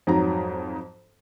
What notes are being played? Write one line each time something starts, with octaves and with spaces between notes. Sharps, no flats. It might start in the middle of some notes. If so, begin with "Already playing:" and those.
F2 G#2 F#3 A#5